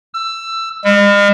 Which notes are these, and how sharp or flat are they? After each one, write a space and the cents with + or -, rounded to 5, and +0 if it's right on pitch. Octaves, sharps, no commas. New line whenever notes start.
E6 +15
G#3 -45